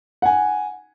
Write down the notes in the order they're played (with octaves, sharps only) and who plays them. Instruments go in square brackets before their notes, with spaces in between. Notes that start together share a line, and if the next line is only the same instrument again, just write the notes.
[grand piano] F#5 G#5